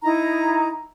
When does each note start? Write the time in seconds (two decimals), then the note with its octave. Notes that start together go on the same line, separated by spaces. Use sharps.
0.03 D#4 E4 A#5